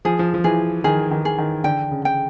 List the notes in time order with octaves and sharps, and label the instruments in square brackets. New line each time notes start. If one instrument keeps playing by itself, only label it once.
[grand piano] F3 [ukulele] G#4
[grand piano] F3
F3
[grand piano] E3 [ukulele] G#4
[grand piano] D#3 [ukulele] G#4
[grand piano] D#3
[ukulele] G#4
[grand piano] D#3
[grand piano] D3 [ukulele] G5
[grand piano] C#3
[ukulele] G5